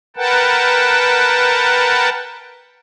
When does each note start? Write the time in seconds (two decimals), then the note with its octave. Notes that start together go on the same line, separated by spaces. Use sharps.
0.17 A#4 B4 F#5 G5 A5